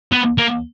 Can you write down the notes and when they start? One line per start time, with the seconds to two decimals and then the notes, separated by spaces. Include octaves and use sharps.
0.12 B3
0.38 A#3